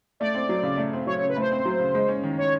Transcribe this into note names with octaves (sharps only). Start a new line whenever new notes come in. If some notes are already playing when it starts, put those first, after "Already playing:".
A3 D5
C4
F#3
C#3
A3
C4
F#3 C#5
C#5
C#3
B4
A3 C5
C4
F#3
C#3
G#3
C#4
D#3
C#5